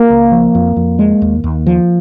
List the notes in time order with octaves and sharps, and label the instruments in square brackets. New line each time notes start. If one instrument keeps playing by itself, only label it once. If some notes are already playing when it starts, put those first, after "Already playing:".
Already playing: [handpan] A#3
[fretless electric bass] C#2
F3
F2
F2
G#3
D#2
D#2
F3